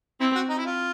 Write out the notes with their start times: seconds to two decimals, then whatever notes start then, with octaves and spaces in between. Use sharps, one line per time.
0.20 C4 E4
0.35 F#4
0.49 D#4
0.58 E4
0.66 F4